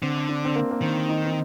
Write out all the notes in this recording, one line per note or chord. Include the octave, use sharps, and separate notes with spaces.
D3 C4
D4
C4
A#3
A#3
D#3 C4
D#4
C4